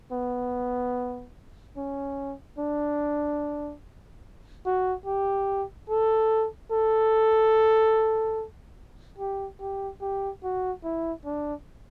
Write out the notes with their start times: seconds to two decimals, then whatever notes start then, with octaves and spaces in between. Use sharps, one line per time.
0.12 B3
1.77 C#4
2.59 D4
4.65 F#4
5.06 G4
5.89 A4
6.72 A4
9.18 G4
9.61 G4
10.01 G4
10.43 F#4
10.84 E4
11.25 D4